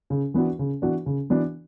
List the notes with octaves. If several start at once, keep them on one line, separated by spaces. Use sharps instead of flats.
C#3
E3 B3 D4 F#4
C#3
E3 B3 D4 F#4
C#3
E3 B3 D4 F#4